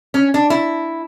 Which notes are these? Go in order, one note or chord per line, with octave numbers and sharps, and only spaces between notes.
C#4
D4
E4